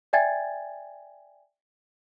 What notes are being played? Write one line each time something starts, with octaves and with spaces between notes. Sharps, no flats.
D5 E5 G5 G#5 G#6 A6